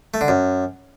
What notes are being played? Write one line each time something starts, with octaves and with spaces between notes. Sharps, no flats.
A3
D3
F#2